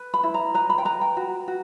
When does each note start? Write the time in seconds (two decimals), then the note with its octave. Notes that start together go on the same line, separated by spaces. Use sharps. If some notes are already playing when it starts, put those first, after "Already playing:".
Already playing: B4
0.14 B5
0.23 E4
0.34 A#5
0.54 B4 A#5
0.70 B5
0.78 G5
0.85 B4 A#5
1.01 G5
1.17 F#4
1.48 F#4